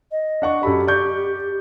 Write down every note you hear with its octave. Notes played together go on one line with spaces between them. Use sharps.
D#5
D4 F#5 C#6
F#2 G4 A4 B5
D5 C#6 G6